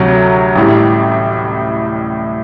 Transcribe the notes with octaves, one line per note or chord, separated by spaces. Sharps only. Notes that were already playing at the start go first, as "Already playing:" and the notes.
Already playing: D2 C3 F#3
A1 A2 G3